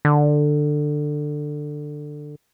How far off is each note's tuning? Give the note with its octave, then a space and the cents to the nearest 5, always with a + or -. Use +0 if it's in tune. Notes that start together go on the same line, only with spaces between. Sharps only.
D3 +15